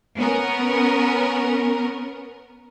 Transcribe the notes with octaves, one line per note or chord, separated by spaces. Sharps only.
B3 C#4 A#4